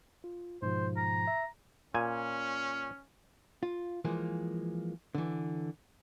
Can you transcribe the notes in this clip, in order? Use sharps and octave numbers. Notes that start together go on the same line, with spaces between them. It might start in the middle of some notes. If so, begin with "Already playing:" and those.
F4
G#2 B2 F3 C5
A#5
E5
A#2 C#4 G#5
F4
E3 F3 G#3 A#3
D3 E3